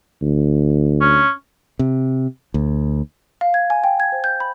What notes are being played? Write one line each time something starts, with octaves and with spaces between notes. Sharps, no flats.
D2
C#4
C3
D2
F5
G#6
G#5
G5
G#6
C5
G6
B5